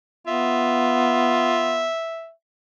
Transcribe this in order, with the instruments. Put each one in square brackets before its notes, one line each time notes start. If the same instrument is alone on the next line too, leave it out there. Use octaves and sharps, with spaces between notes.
[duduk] B3 [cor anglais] F4 [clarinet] E5